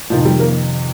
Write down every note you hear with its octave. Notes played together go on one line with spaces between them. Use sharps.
F2 C3 D#3 F3
G3
A#3